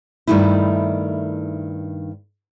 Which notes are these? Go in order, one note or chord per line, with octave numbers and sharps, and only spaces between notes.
G2 D#3 A3 D#4 E4